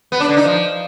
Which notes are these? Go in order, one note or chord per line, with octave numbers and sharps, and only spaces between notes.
B3
D4
D3
D#4
F3